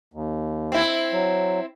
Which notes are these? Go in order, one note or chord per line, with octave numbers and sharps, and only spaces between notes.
D#2
C4 E4
F#3